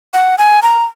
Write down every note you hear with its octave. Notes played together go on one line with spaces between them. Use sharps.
F#5
G#5
A#5